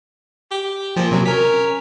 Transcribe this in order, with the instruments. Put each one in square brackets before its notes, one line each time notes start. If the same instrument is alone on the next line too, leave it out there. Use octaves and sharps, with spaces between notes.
[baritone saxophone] G4
[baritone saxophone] A#2 [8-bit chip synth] F3
[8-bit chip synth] C3 F#3
[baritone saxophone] C#4 [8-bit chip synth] A#4 B6